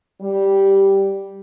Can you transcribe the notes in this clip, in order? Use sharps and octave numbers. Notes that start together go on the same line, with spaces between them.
G3